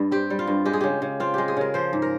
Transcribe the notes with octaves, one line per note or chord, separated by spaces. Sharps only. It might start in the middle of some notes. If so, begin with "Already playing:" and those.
Already playing: G2 G3
C4 G4
G3
F4
G2
G#3 G4
G#4
C#3 G4
C#3
C4 F4
G#3 G4
G#4
C#3 A#4
F3 C5
G#2
A#4